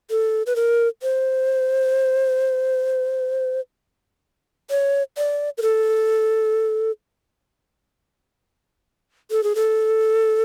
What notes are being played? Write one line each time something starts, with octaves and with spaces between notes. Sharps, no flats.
A4
B4
A#4
C5
C#5
D5
A#4
A4
A4
G#4
A4